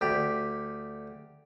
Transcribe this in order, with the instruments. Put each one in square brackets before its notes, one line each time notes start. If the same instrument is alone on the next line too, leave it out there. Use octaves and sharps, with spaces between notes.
[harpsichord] D2 G4 B5